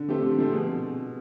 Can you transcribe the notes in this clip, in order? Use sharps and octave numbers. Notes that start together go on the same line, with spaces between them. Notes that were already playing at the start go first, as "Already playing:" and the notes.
Already playing: D3
F3 A3 C4 G4
D3
F3 A3 C4
B2 G#4